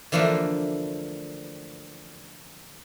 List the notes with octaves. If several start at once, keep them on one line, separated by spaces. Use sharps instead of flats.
D3 E3 F3 A3 A#3 D4